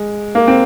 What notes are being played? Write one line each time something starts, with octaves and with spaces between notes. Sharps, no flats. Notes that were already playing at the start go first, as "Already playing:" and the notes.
Already playing: G#3
A#3
C4